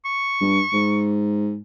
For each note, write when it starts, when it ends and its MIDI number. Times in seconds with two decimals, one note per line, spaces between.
0.06 1.09 85
0.41 0.61 43
0.73 1.59 44